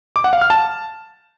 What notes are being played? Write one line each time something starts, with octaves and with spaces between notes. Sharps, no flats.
D6
F#5
F5
F6
A5